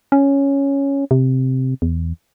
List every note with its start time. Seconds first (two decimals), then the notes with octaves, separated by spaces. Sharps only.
0.12 C#4
1.11 C3
1.82 E2